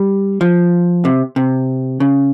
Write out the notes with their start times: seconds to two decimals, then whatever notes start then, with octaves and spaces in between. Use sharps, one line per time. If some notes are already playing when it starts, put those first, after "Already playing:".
Already playing: G3
0.41 F3
1.05 C3
1.36 C3
2.00 C#3